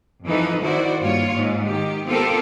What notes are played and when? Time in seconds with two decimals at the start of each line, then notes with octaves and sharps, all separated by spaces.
0.24 F2 E3 F3 D#4 A4 B4
0.61 D#3 E4 F#4 C5 D5
1.00 G2 A#3 F4 C#5
1.34 G#2
1.64 D#3 G4
2.07 B3 C4 F4 G4 A4 A#4